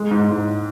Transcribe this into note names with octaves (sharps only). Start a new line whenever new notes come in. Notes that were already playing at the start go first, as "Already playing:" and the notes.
Already playing: G#3
G#2
G#2